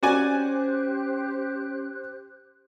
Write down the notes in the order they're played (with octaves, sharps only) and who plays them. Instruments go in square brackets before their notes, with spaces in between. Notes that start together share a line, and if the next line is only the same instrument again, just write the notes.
[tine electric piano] C#4 [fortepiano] F#4 D5 G#5 [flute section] G4 C5 F#6